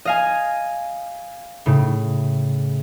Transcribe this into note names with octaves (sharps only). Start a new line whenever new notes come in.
D#5 F5 G#5
A2 C#3